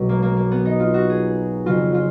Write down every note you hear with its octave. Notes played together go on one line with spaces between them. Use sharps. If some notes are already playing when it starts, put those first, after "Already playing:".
Already playing: B1 B2 F#3
A#3
A#3
A#3
B3
D#4
F4
F#4
G#4
F2 C#3 F#3 F4
F4